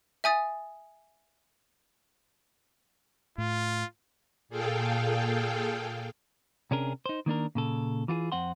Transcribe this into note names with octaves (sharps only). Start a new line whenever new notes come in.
E5 G#5 D#6 A6
A2 F4
A#2 G#4 A4 F5 G5
C3 C#4 D4 G#4 A#4
D#4 C5
D#3 A#3 D4 A#4
A#2 C#3 A4
E3 F4 F#4 G#4
F2 C4 F#5 C6